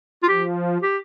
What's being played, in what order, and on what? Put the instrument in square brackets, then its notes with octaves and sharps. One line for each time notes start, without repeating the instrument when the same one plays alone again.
[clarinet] F4
[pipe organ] F3 [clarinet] G4
[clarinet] G4